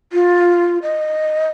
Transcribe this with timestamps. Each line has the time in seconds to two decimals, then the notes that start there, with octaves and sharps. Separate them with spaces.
0.13 F4
0.82 D#5